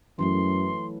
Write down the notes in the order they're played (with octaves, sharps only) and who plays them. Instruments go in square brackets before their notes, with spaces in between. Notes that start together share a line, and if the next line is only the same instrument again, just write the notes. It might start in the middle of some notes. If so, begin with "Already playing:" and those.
[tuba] F#2 [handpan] E3 F#3 A3 [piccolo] C6